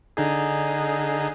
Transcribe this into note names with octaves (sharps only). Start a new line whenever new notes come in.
D3 D#4 G#4